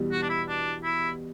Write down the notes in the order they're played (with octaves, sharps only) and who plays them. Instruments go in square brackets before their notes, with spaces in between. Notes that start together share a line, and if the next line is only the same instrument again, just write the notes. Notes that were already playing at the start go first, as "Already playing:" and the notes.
Already playing: [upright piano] E2 B2 G3
[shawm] F#4
D4
E4
D4
E4